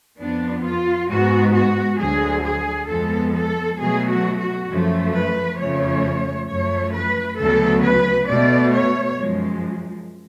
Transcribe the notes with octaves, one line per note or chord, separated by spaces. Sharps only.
F2 F3 B3 D4
F4
G#2 G#3 B3 F#4
F#4
D2 D3 F#3 G#4
G#4
F2 F3 G#3 B3 A4
A4
B2 F#3 A3 G#4
F#4
F#4
F#2 F3 A3
B4
F2 C#3 F3 A3 C#5
F#2 F3 A3 C#5
B4
D2 C#3 F#3 B3 A4
B4
B2 A3 D5
C#5
F#2 F3 G#3